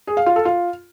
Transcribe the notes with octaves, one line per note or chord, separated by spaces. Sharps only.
G#4
F5
F4
A4
F4